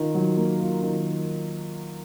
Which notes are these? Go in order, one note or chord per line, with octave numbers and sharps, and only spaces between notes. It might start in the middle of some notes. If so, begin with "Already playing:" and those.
Already playing: D#3 F4
F#3
A#3
F4
D#3